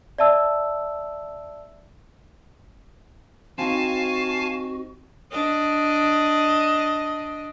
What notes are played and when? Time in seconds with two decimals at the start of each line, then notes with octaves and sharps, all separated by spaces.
0.18 D5 E5 A5 E6
3.58 C4 D#4 F#4 F5 G#5 A5
5.32 D4 D#5